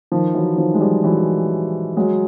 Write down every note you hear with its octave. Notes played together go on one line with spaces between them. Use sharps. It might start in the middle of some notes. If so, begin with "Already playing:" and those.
D#3 F3
E3 F#3
D#3 F3
G#3
F3 G3
E3 F#3
F#3 G#3